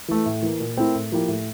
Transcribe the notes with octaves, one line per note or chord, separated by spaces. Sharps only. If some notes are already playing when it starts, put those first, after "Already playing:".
E3 A3
A2
E3 A#3
A#2
A3 C4 E4 A#4
A2
F3 A#3 E4 G4
A2